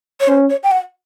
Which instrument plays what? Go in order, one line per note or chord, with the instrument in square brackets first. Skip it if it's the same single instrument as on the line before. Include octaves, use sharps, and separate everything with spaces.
[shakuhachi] C#5
[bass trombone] C#4 [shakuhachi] C5
[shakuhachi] C#5
G5
F#5